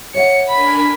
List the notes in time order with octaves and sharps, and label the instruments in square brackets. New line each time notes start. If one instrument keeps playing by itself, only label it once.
[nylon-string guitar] C#5 E5 F#5 [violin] C#7
[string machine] D4 A#4 G#5 [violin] B5